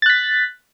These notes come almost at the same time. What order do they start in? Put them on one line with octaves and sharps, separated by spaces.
A6 F#6 B6